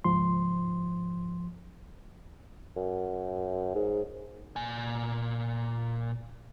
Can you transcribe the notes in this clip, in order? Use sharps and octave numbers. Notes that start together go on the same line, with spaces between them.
C#2 G#2 F3 C6
F#2
G#2
A#2 G#5